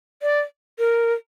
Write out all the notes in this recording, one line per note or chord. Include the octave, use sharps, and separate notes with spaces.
D5
A#4